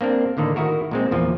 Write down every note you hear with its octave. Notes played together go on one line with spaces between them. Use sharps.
A#3 C4 D4 A#4
A2 D3 D#3 A#3
D#3 E4 F#4 A#4
A#2 G#3 C4
E2 A#2 F3